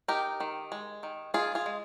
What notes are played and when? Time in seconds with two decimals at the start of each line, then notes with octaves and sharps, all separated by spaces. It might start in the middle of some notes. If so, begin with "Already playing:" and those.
0.08 D#4 G4 A#4
0.40 D#3
0.72 G#3
1.03 D#3
1.34 D#3 F4 G#4
1.55 F4 G#4
1.66 G#3